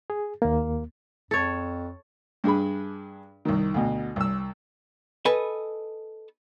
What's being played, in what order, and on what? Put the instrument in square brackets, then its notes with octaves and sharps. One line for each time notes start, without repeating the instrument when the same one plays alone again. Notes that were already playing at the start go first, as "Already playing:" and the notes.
[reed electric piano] G#4
D#2 A#3
[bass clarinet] F2 [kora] A4 C#5
[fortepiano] G2 D4 G#4 B5
C2 D#3
D2 B2
C2 E6
[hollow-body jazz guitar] A4 B4 D#5 G#5